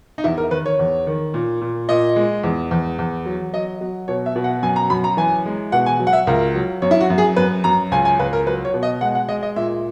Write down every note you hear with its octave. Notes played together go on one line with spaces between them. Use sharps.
D#4
E2 E4
A#4
D#3 B4
C#5
E2
D#3
A#2
A#2
A#2 D#5
G#3
E2
E2
E2
F#3
F#3 D#5
F#3
B2 C#5
E5
B2
F#5
F#2 G#5
A#5
F#2 B5
A#5
E3 G#5
G#3
B2 F#5
G#5
F#3
F#5
E5
C#2 A#4
F#3
F#2 C#5
E4
F#4
F#2
G#4
F#2 B4
F#2 A#5
C#2 G#5
G#5
C#2 B4
A#4
F#3 B4
C#5
B2
D#5
G#3 F#5
F#5
G#3 D#5
D#5
A#2 E5